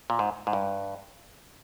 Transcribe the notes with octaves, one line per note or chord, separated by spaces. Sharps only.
A#2
G#2
G#2
G2